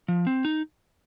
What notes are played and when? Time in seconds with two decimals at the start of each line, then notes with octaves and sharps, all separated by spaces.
0.08 F3
0.27 C4
0.45 D#4